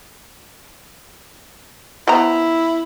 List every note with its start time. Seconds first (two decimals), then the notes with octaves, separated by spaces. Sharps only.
2.08 B3 E4 C5 A#5